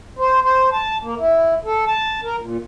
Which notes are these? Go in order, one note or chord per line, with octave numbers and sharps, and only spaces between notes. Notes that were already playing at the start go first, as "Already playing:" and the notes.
C5
C5
A5
A#3
E4
A4
A5
A#4
A#2